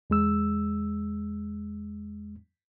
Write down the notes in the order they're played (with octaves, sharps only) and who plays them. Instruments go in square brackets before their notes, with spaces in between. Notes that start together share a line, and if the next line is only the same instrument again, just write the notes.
[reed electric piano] E2 G#3 E6